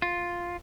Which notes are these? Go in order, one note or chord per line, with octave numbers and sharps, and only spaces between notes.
F4